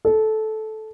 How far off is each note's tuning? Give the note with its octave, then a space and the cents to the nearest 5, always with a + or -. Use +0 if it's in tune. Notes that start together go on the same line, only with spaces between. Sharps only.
A4 -15